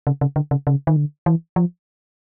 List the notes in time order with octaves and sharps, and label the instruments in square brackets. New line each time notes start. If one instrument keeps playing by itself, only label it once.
[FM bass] C#3
C#3
D3
C#3
C#3
D#3
D3
E3
F3